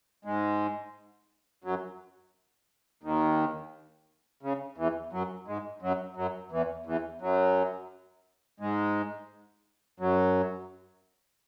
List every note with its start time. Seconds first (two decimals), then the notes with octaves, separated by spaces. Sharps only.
0.25 G#2 G#3
1.64 F#2 F#3
3.03 D#2 D#3
4.43 C#3
4.78 E2 E3
5.13 F#2 F#3
5.47 G#2 G#3
5.82 F#2 F#3
6.16 F#2 F#3
6.52 E2 E3
6.86 E2 E3
7.21 F#2 F#3
8.60 G#2 G#3
10.00 F#2 F#3